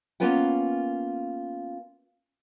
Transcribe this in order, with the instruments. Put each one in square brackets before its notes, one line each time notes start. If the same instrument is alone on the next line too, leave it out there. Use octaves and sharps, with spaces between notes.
[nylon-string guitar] A#3 B3 C#4 F4 B4 G5